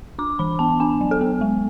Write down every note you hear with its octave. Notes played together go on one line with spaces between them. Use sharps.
D4 D6
E3 B5
B3 A5
D4 G#5
F#3
A4
B3
G#3